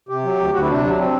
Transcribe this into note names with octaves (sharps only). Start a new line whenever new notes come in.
C3 G4
F#3
D2
D2 F#4
E4
C3 D4
F#3
C4